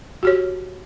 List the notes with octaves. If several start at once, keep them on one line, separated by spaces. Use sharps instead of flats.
F#4 G4 C#5